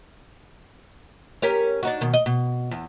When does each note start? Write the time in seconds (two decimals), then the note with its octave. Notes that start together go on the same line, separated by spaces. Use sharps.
1.42 C#4 G4 A#4
1.83 D4 D#4 F#4
2.01 B2 D#3
2.13 D#5
2.26 B2
2.71 E2